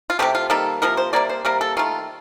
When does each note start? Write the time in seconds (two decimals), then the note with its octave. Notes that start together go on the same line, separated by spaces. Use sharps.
0.10 F4
0.19 C3 D#3 A3 G4
0.35 F4
0.50 D#3 G3 A#3 A4
0.82 C3 F3 A#3 A#4
0.97 C5
1.13 C3 G3 A#3 D5
1.29 C5
1.45 C3 G3 A#3 A#4
1.61 A4
1.77 D#3 A3 F4